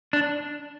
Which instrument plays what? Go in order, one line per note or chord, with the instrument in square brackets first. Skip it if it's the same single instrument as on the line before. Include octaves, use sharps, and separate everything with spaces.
[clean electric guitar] D4